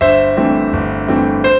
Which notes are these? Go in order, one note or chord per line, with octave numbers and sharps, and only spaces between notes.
G1 C5 E5
G2 E3 A3 C4
G1
G2 E3 A3 C4
C5